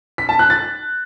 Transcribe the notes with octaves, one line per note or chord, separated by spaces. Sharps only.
B6
A5
F#6
A6